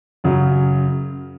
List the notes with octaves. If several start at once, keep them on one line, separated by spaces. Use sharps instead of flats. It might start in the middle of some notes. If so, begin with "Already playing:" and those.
F#2 C#3 F#3